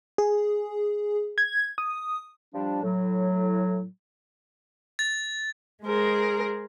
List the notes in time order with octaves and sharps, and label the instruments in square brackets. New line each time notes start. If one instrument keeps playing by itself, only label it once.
[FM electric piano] G#4
G#6
D#6
[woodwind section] F3 G3 D4
A2 F#3
[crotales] A6
[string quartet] G#3 G#4 A#4 C5